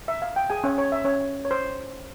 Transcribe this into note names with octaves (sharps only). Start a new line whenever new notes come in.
E5
F5
G5
G#4 G#5
C#4 C#5
C#5
E5
C#4 C#5
C#5
C5